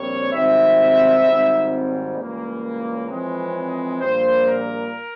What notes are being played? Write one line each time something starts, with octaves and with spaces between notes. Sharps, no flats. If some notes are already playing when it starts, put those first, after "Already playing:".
Already playing: A#1 A#2 G3 C4 C#5
G#1 G#2 G3 C4 E5
G#1 G#2 G3 C4
C#5
C#2 C#3 E3 G3 A#3
C#5
F2 E3 G#3 C4
A#1 A#2 G3 A#3 C5
A#4